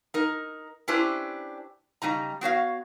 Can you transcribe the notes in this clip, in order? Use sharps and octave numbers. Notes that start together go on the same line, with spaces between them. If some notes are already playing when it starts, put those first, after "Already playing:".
D#4 A#4
C#4 D4 E4 G4 B4 C5
C#3 G3 D#4 A#5
B3 F#4 C#5 F5